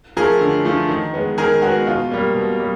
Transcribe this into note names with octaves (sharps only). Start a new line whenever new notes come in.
F3 A3 G#4 A#4
D3
F3 A3
D#3
G#3 B3
D#3 G#4 A#4
G#3 B3 F#4
B2 F4
G3 A#3
B2
G3